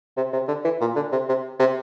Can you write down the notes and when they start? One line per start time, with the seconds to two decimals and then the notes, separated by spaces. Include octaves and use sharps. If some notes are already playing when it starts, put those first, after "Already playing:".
0.17 C3
0.33 C3
0.48 D3
0.64 E3
0.81 A#2
0.96 D3
1.12 C3
1.28 C3
1.60 C3